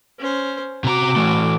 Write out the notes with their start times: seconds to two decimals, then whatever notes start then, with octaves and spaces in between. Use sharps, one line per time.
0.19 C#4 C5
0.84 C3 F#4 A#5 D6
1.16 E3 A3